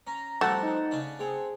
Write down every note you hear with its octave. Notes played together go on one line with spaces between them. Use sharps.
C#4 A#5
F3 G3 A3 C4 F#4 F#5 A5
D#4
C#3 C#4 D4
C4 G#4 C#5